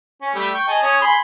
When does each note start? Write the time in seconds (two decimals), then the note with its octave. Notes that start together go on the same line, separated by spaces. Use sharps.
0.22 C#4
0.35 G3 A3
0.54 G5 C#6
0.68 G#4 D#5 A5
0.83 C#4 C#5 D#6
1.01 G#4 B5 C6